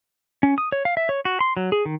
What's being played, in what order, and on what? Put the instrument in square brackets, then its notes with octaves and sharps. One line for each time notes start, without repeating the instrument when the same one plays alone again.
[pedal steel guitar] C#4
D#6
C#5
F5
E5
C#5
F#4
C6
F#3
G#4
D#3